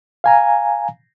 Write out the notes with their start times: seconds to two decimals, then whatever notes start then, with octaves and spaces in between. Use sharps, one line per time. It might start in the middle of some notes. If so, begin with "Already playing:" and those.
0.24 F5 G#5 A#5